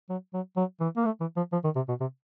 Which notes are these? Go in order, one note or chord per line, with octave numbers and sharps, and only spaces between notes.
F#3
F#3
F#3
E3
A#3
A3
E3
F3
F3
D#3
C3
B2
C3